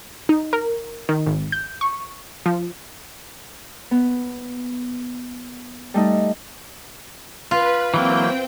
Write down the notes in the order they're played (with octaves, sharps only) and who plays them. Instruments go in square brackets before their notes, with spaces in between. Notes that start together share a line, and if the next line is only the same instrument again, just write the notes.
[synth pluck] D#4
A#4
D#3
G#1
G6
C#6
F3
[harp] B3
G3 A3 D#4
[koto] F4 [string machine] B4
[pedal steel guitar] E3 F#3 A#3 [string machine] C4 G5